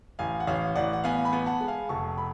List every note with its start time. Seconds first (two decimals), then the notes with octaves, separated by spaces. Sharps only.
0.19 A1 F5 G#5
0.40 F#5
0.47 A1 C#5 F5
0.76 A1 D5 F#5
0.93 F#5
1.04 B3 F5 G#5
1.25 G#5 B5
1.33 B3
1.46 F#5 A5
1.61 G#3
1.68 F5 G#5
1.89 F1 A5 C#6
2.18 B5